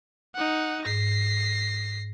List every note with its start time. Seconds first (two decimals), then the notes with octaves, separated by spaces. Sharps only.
0.35 D#4 F#5
0.86 G#2 A#6 C7